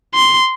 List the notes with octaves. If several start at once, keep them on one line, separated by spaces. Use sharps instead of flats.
C6